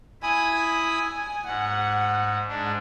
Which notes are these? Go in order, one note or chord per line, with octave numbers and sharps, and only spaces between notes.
E4 G#5 B5 D#6
G#2 F#5
G#2 D4